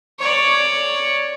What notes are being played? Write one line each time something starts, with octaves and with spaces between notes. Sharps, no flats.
C#5 D5